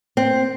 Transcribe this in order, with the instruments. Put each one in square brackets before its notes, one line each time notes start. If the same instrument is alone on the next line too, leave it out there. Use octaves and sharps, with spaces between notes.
[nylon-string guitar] C4